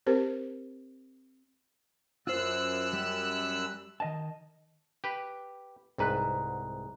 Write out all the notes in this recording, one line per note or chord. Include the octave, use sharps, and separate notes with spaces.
C4 G4 A#4 C5
F#2 F4 C5 E6 F#6
G3
D#3 D#5 A5
G4 B4
C2 G#2 G#4 B4 A#5 F#6